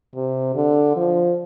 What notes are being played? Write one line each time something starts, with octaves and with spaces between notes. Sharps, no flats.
C3
D3
F3